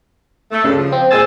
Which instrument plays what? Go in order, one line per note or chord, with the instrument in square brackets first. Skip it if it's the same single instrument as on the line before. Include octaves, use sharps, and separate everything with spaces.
[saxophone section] A3
[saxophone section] D2 G2 A4 [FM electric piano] C#3
[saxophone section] F3
[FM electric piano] C4
[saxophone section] A#2 G#3 C5 [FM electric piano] G#5 E6 A6